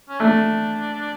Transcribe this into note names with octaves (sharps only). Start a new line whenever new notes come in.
C#4
A3 D4